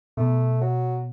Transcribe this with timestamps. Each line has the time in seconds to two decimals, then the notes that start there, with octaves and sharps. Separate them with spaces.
0.17 B2 A3
0.61 F#3